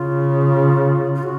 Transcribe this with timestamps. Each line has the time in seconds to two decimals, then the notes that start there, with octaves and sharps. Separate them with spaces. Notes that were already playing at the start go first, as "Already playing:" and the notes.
Already playing: C#3 F4
1.15 F4
1.23 F#4